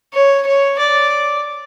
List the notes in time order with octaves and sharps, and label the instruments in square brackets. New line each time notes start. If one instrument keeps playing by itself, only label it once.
[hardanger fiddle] C#5
C#5
D5